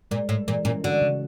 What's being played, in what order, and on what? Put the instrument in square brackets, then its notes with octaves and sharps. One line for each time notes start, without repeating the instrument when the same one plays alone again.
[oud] A#2 [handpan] G#3
[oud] A2 [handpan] G#3
[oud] A#2 [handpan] E3
[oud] A#2 [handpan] C#4
[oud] D3 [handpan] F#4
[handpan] C#3